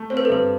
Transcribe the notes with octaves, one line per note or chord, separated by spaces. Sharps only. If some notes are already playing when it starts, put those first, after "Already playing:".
Already playing: A3
C4 C5
B4
A4
G2 B4